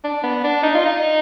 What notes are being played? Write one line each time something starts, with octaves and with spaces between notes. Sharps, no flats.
D4
B3
D4
D#4
F4
D#4